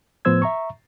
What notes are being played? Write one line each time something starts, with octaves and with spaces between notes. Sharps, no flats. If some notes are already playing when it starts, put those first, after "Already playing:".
A2 F3 B3 C5 E6 G#6
E5 A#5 C#6